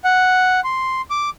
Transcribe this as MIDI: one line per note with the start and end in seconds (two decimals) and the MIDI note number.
0.05 0.60 78
0.64 1.02 84
1.10 1.30 86